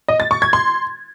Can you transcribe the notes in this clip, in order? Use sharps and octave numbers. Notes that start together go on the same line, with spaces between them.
D#5
A6
C#6
G#6
C6